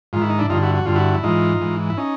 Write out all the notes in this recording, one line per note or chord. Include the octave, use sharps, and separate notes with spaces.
G#2 D#3 F4
E4
D#4
D4 E4
G2 D3 D#4 F4
E4 F#4
F#4
G2 D3 F4
E4 F#4
E4
G#2 E3 D#4 F4
G#2 E3
E4
C#4 D#4